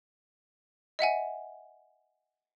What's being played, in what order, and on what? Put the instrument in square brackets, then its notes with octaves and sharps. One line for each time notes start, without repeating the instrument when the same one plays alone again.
[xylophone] D#5 E5 F#5 G#5